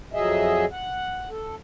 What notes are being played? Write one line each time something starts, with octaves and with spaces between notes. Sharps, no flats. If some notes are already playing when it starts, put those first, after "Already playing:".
F2 F#3 G#4 D#5 E5
F#5
A4